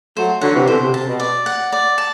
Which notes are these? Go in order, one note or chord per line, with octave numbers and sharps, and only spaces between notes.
F#3 A3 C5
D3 F#3 F#5
C3 E3
B2 D3 C5
C3
C3 A5
B2
D5
F#5
D5
A5